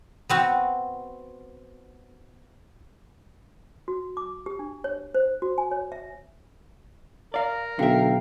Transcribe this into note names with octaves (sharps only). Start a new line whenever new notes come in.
B3 C4 F#4
F#4
D6
G4
D4
C#5
C5
F#4
G#5
C#5
E5
A#4 D5 F5
B1 D3 E5 F5 G5